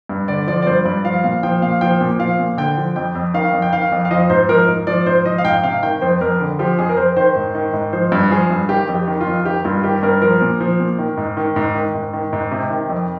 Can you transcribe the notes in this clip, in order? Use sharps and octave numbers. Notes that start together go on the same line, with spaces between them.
G2
D3 D5
F3 D5
D5
G2 C5
G2 D5
F3 F5
A#2 F5
F3 G5
A#2 F5
F3 G5
A#2
F3 F5
A#2
D3 G5
F3
F2 G5
F2
D#3 F5
F2
G5
D#3 F5
F2
F5
F3 D#5
G#2 C5
F3 A#4
G#2
F3 D5
G#2 C5
F3 D#5
F5
G#2 G5
C3 F5
D#3 G5
F2 C5
F2 A#4
D3
F3 G4
F2 G#4
A#4
F2 C5
D#3 C5
G#2
D#3
G#2
F3 C5
G2
F3 G#4
G2
D#3 G4
F2
G4
D#3
F4
F2
D#3 G4
G2 F4
D#3 G4
G2 A#4
F3 A#4
A#2
F3
A#2
D#3
G#2
D#3
G#2
D#3
G#2
D#3
G#2
C3
D#3
F2